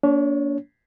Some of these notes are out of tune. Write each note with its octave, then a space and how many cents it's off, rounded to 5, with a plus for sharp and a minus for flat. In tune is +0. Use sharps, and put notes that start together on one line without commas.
A#3 +10 D4 -35 C#5 +0